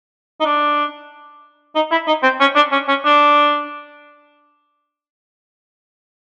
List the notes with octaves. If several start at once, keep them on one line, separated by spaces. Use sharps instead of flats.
D#4
D4
D#4
E4
D#4
C4
C#4
D4
C#4
C#4
D4